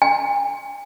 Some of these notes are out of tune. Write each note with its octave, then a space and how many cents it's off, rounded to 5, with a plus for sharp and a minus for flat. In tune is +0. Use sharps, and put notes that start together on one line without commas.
G#5 -45